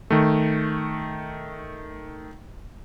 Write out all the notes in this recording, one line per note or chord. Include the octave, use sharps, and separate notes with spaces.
D#3 A3